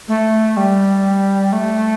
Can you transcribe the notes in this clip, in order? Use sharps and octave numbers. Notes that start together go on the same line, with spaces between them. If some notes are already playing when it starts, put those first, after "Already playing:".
A3
G3
A3